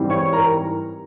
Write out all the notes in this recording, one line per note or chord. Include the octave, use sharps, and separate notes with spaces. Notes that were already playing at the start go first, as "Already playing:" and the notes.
Already playing: G#2 E3 G3 C4
C#5 C#6
A#4 A#5